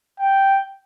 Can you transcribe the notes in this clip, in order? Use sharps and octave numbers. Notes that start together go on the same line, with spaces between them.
G5